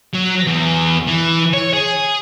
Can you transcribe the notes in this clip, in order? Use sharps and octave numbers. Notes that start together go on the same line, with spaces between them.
F#3
E2
E3
C#5
G#4